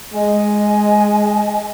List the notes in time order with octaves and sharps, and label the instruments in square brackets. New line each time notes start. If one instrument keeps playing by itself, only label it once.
[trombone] G#3 [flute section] D#5 G#5